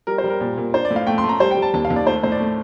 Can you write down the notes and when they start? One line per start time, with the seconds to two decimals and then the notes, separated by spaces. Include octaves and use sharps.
0.07 G3 A#4
0.18 C5
0.24 G3
0.30 A#4
0.41 A#2
0.57 A#2
0.74 D4 C5
0.85 D5
0.90 A2
0.96 F5
1.07 A3 G5
1.18 C6
1.24 A3
1.29 A#5
1.40 G3 C5
1.51 G5
1.57 G3
1.62 A5
1.74 D#2 A5
1.85 F5
1.90 D#2
1.96 D5
2.07 A3 C5
2.23 A2 C5
2.32 D5
2.40 A3